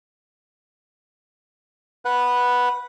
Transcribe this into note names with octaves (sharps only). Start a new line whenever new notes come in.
B4 F#5